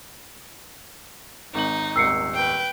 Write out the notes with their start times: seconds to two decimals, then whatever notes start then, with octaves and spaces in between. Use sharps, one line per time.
1.54 G#1 D#4 F#7
1.96 D#1 G#1 E6 C7 C#7
2.34 B4 G5